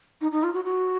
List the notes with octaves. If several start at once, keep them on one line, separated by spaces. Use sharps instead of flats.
D#4
D#4
F4
F#4
F#4